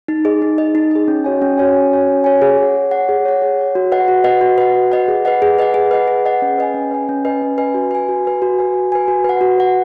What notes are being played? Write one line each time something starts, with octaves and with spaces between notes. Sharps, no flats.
D#4
G#4 D#5
D#4
G#4 D#5
D#4
G#4 D#5
C#4
F#4 C#5 G#5
C#4
F#4 C#5 G#5
C#4
F#4 C#5 G#5
C#4
F#4 C#5 G#5
G#4
C#5 F#5
G#4
C#5 F#5
G#4
C#5 F#5
G#4
C#5 F#5
F#4
B4 D#5 F#5
F#4
B4 D#5 F#5
F#4
B4 D#5 F#5
F#4
B4 D#5 F#5
G#4
B4 D#5 F#5
G#4
B4 D#5 F#5
G#4
B4 D#5 F#5
G#4
B4 D#5 F#5
C#4
B4 D#5 G#5
C#4
B4 D#5 G#5
C#4
B4 D#5 G#5
C#4
B4 D#5 G#5
F#4
B4 G#5
F#4
B4 G#5
F#4
B4 G#5
F#4
B4 G#5
F#4
B4 F#5
F#4
B4 F#5